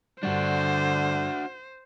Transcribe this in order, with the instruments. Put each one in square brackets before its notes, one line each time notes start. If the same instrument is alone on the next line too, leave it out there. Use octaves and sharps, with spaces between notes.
[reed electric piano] G2 G3 [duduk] D3 [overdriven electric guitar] D4 F#4 [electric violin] C5